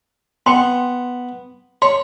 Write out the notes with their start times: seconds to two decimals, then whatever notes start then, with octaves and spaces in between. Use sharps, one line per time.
0.46 B3 G5 C6
1.82 C#5 C6